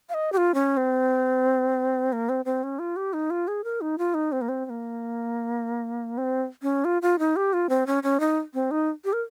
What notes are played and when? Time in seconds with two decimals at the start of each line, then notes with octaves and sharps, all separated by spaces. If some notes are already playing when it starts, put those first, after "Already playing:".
0.09 F5
0.14 D#5
0.32 G4
0.37 F4
0.54 C#4
0.77 C4
2.12 A#3
2.29 C4
2.45 C4
2.63 C#4
2.79 F4
2.96 G4
3.13 D#4
3.30 F4
3.48 G#4
3.64 A#4
3.81 D#4
3.98 F4
4.14 D#4
4.32 C4
4.41 A#3
4.49 C4
4.65 C4
4.70 A#3
6.18 C4
6.62 C#4
6.85 F4
7.02 F4
7.19 D#4
7.36 G4
7.53 F4
7.69 C4
7.87 C#4
8.03 C#4
8.20 D#4
8.54 C4
8.71 D#4
9.05 G4
9.13 A#4